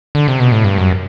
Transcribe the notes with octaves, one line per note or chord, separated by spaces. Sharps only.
D3
C3
B2
A2
G2
F#2